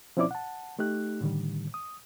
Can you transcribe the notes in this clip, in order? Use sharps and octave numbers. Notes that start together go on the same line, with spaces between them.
F3 C4 C#4 E4 D5 D6
F#5 A5
A3 D#4 G4 F#6
A2 D3 D#3 G3
D#6